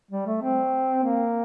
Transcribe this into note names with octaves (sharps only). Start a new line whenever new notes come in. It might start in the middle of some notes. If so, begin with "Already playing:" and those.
G3
A3
C4
A#3